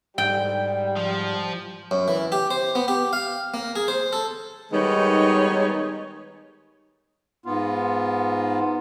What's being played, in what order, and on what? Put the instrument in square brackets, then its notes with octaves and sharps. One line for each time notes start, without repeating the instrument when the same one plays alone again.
[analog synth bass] G#2 [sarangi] G3 [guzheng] G5
[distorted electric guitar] F3
[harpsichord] F#2
E3
G4
C5
B3
G4
F5
A#3
G#4
C5
A4
[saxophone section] D#3 G3 G#3 B3 D#4 C#5
[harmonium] G#2 B3 F4